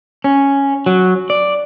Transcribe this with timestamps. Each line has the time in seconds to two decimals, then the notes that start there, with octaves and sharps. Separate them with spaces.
0.24 C#4
0.86 F#3
1.30 D5